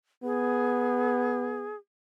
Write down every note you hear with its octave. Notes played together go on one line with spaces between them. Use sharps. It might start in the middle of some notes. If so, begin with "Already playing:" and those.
B3 G#4